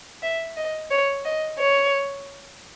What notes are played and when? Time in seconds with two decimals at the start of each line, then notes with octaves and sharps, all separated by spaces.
0.23 E5
0.57 D#5
0.91 C#5
1.25 D#5
1.60 C#5